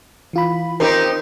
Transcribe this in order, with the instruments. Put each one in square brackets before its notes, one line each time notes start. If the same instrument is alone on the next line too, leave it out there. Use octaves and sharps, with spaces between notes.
[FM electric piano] E3 F4 B5
[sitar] C4 D#4 G4 [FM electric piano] A#4